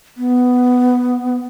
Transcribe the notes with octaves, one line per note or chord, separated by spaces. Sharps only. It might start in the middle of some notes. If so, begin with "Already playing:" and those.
B3